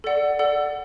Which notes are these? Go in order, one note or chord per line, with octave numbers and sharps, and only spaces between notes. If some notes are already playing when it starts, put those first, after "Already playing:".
A4 D5 F#5
A4 D5 F#5